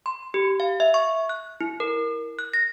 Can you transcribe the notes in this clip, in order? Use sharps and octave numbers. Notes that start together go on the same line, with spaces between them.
C6
G4
F5
E5
C#6
F#6
E4
A#4
F#6
A#6